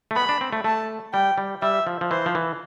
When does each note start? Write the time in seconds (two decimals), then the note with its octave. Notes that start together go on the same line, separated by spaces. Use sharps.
0.11 A3
0.16 B3 B5
0.29 D4
0.41 C4
0.53 A3
0.64 A3 A5
1.13 G3 G5
1.38 G3
1.62 G3 E5
1.87 F3
2.01 F3
2.10 E3 C5
2.26 F3
2.35 E3